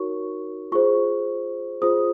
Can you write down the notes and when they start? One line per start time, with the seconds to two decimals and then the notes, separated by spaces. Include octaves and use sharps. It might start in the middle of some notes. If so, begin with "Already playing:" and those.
Already playing: D#4 F#4 A#4 C#5 C#6
0.72 F4 G#4 C5 C#6
1.82 F4 G#4 C5 D#6